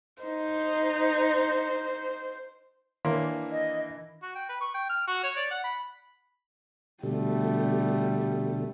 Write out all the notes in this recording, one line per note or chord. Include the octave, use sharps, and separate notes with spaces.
D#4 C5
D#3 E3 A#3 D4 E4
D#5
F#4
G5
B4
C#6
G5
F6
F#4
C#5
D5
F#5
B5
B2 D3 G3 A3 G4